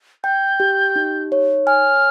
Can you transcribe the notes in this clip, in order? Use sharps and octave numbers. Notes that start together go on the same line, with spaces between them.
G5 G6
G4
D#4
C#5
G#5 F6